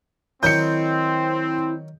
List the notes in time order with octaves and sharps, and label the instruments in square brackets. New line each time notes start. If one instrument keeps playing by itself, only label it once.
[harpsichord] D#3 F#3 D#4 [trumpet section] C4 [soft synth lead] E4 [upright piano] G6 C#7